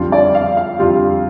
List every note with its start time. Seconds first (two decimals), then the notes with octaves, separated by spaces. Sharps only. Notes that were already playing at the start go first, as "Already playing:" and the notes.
Already playing: F2 D3 G3 F4
0.12 D5
0.35 F5
0.57 F5
0.79 F2 D3 G3 F4 G4